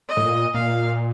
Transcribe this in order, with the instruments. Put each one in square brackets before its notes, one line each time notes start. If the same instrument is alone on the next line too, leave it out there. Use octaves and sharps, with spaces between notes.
[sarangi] D#5
[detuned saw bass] A2
A#2
[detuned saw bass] A#2 [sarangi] F5